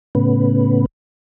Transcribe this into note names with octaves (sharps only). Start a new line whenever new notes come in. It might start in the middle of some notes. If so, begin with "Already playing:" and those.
A2 C#3 B3